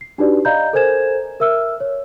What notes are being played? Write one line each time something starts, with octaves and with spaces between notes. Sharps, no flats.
C7
D4 D#4 F#4 G4 B4 D5
D5 D#5 F5 A#5 B5 G6
A4 A#4 C5 G#5 G#6 E7
A#4 E5 E6 F6
C#5